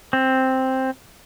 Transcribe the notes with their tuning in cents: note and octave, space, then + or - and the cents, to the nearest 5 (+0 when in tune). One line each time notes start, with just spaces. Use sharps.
C4 +5